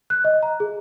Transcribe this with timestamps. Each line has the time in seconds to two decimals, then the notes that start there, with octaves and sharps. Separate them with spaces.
0.10 F#6
0.24 D#5
0.43 A#5
0.60 G#4